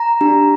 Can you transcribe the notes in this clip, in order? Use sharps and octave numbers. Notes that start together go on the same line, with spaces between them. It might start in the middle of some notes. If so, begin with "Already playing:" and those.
Already playing: A#5
D4 G4